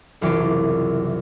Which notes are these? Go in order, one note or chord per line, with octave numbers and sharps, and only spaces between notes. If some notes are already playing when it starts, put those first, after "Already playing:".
F#1 C2 E3 F4 C#5 D6